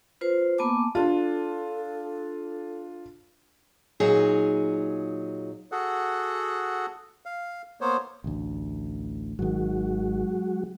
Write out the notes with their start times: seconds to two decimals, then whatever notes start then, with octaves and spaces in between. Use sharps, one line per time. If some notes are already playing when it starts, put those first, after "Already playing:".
0.21 F4 B4 C5
0.58 A#3 B3 G#5 A5 D6
0.95 D4 F4 A4
4.00 A#2 F#3 D#4 G#4
5.72 F#4 G#4 A4 F#5
7.26 F5
7.81 A#3 B3 C5 C#5
8.24 A1 D2
9.39 G#1 D#3 F#3 G#3 F#4